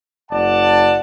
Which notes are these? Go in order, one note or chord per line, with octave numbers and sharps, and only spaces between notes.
F#1 D5 F#5 A5